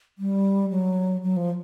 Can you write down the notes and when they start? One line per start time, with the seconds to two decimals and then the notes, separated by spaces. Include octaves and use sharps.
0.18 G3
0.70 F#3
1.23 F#3
1.37 F3